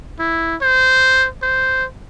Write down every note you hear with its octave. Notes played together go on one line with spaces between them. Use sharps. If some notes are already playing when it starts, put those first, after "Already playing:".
E4
C5
C5